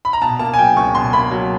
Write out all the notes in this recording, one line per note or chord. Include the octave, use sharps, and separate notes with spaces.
B5
A#5
B2 A5
A#3 A5
G#5
F#3 G5
C#2 C#6
B2 C6
A#3 B5
F#3